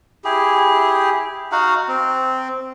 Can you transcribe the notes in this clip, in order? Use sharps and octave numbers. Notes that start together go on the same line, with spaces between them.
E4 G4 G#4
D#4 F#4 F5 F#5
C4